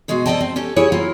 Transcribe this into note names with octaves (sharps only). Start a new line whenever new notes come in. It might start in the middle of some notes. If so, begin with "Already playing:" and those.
B2 G#3 F#4 G#4
C3 A#3 D5 D#5 G5 A5
C4
C#4 G4 A4
E4 G4 G#4 C#5
F#3 A#3 E4 F4